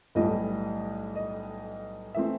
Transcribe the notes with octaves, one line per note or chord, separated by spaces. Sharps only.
B1 A2 E3 G3 D#5
D#5
E3 A3 C4 E5